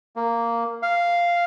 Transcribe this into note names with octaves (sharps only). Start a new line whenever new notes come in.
A#3
F5